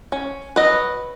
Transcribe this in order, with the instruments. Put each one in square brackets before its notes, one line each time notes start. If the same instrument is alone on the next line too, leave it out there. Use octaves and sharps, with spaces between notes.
[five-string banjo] C#4
F#3 B4 D#5